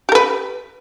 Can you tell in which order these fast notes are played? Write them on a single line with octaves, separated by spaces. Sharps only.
G4 A#4 B4